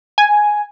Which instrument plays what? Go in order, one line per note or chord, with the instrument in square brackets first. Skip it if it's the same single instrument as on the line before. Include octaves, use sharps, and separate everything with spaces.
[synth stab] G#5